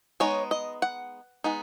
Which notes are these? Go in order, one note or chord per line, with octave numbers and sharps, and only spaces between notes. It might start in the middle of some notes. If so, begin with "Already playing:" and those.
G#3 B3 D#4 C#5
D#5
F#5
G#3 B3 D#4